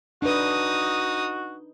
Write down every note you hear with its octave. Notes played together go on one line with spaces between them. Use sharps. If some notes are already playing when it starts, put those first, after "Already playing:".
D4 D#4 F#4 B4 D#6